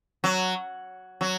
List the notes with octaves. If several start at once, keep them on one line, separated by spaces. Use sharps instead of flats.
F#3
F#3